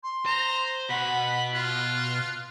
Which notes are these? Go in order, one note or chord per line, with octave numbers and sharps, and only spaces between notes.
C6
C5 A#5
B2 F#5 B5
F4 F#6